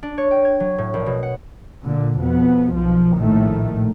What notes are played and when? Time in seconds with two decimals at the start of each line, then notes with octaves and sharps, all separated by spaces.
0.03 D4
0.18 C#5
0.31 G5
0.45 G#6
0.60 F#3
0.78 A2
0.94 A#1
1.06 B2
1.23 F#5
1.84 A#2 D3
2.20 F2 B2 B3
2.74 B1 F3
3.16 A#1 A2 D#3 A3